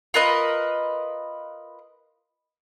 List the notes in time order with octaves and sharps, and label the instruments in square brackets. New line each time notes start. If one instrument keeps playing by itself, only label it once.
[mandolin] F4 A#4 B4 D#5